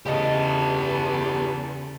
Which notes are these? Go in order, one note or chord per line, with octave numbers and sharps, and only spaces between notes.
E2 C#3 A3 G4 A4 D#5